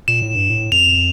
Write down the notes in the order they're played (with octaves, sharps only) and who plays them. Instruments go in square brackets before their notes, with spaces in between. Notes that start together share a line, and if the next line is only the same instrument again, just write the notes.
[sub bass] A#2 [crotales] E7
[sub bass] A2
G2
A2
[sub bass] F2 [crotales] F7